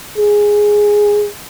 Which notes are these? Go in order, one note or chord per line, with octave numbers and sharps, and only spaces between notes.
G#4